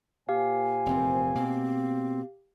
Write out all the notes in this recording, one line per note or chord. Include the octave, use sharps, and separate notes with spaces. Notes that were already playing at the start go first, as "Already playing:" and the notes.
A#2 G4 C5 F5 G#5
F1 E2 C4
B2 A#3 C4